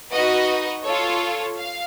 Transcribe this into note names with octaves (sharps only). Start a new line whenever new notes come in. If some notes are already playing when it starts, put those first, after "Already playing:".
D#4 F#4 B4 D#5
F4 A4 C#5
F5